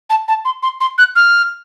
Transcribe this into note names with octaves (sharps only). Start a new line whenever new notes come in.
A5
A5
C6
C6
C6
F#6
F6